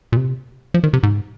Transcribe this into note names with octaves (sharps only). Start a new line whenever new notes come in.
A#2
C3
F3
D#3
C3
G#2